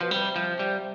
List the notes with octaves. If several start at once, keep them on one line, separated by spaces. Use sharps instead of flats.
B2 F3
C3 G3
F3
G3